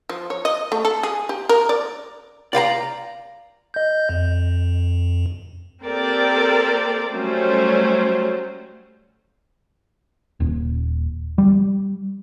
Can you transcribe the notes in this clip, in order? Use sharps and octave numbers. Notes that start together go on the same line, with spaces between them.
F3
C#5
D#5
A3
A4
G#4
G4
A#4
D5
D5 F5 G5 A#5
D#5 G6
F2
A#3 C4 G4 A4 A#4 D5
F#3 G3 A3 C#4 C5
D#1
G3